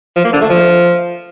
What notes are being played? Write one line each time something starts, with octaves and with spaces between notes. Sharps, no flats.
F3
A#3
D3
A3
F3